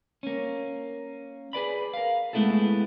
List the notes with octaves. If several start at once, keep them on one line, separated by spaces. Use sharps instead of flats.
A#3 C#4
G#4 B4 D5 B5
A#4 F5
G#3 A3 B3 E4 G#4 A4